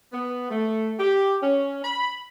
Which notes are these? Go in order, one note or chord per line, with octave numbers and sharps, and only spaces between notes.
B3
A3
G4
C#4
B5